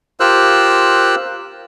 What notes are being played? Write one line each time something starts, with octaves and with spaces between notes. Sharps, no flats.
F4 G4 A#4 C5 E6 F#6